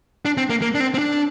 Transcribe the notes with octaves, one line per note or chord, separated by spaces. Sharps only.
D4
C4
A#3
A#3
D4
C4
C4
D4